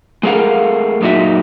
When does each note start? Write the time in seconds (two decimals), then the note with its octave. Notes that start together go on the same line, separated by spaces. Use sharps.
0.23 G#3 A3 G#4 A#4 F5 F#5
1.01 F#2 A#2 G#3 D#4 F#4 E5